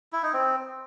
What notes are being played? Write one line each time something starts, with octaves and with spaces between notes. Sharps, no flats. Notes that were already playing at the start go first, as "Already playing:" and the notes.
E4
D#4
C4